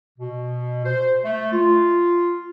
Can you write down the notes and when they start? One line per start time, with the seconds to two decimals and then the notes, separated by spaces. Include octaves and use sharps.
0.19 B2
0.84 C5
1.24 A3
1.53 F4